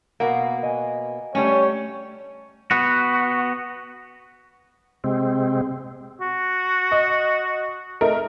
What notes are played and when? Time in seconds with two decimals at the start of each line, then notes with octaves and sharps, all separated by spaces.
0.20 B2 A#3 F#5
0.63 D#5 G#5 D#6
1.35 G3 A3 C#4 C#5
2.71 B3 F#4
5.04 C3 G#3 C4
6.21 F#4
6.92 D#5
8.01 A3 D#4 A#4